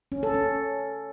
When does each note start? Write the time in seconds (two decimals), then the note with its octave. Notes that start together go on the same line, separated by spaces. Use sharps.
0.12 C#4
0.23 A4
0.34 C#4